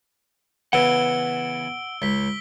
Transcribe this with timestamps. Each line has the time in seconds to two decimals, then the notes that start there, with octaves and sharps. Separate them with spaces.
0.73 C#3 E3 B3 F#5 E6 D7 G7
2.02 C#2 B6 G7